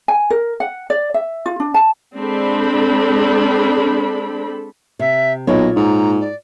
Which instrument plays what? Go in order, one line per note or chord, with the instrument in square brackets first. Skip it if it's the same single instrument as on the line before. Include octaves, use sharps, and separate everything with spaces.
[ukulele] G#5
A#4
F#5
D5
E5
F4
D4
A5
[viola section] G#3 C4 D4 A4 B5
[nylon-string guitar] C3 [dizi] E5
[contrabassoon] B1 [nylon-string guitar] A#2 C#5 [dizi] D#5
[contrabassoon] G#2 [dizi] A#5
[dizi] D5